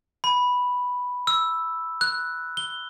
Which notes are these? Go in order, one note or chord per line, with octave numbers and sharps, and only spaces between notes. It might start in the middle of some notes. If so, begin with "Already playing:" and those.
B5
E6
F#6
G7